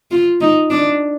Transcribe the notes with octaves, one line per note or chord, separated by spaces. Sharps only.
F4
D#4
D4